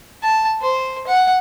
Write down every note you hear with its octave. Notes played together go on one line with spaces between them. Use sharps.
A5
C5
F#5